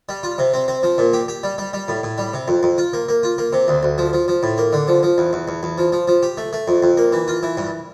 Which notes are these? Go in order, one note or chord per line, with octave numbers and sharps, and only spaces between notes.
G3
F4
C3
C4
C4
F3
A#2
G4
G4
G3
G3
G3
A2
A2
G3
C3
F2
F2
F4
A#3
A#3
F4
A#3
C3
D2
D2
F3
F3
F3
A2
A#3
D3
F3
F3
E2
E2
E2
E2
F3
F3
F3
G4
A3
A3
F2
F2
A#3
E3
F4
E3
G2